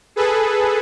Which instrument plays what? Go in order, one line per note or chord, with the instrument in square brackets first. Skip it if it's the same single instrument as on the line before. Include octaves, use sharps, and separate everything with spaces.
[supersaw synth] G#4 A4 B4